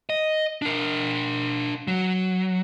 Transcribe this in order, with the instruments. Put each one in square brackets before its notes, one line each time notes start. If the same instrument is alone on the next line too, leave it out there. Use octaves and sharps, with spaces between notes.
[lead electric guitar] D#5
D4 A#4
F#3